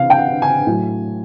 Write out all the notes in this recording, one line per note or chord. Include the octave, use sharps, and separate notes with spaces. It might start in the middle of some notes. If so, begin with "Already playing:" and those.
Already playing: C3 E3 F5
G5
F#5
G#5
A2 F#3